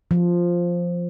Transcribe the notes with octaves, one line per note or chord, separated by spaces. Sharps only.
F3